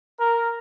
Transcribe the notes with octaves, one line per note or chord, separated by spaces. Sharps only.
A#4